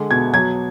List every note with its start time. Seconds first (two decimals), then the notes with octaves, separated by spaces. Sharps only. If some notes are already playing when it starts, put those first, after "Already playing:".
Already playing: D3 G#3
0.11 B2 G#6
0.34 F#3 G#6